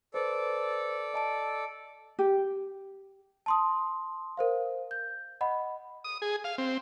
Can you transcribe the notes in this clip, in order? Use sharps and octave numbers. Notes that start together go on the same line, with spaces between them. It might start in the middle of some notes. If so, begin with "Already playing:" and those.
A4 B4 C5 D5
D#5 A5 D7
G4
A5 C6 D#6
A#4 C5 F5
G6
D#5 F#5 B5
D#6
G#4
F5
C4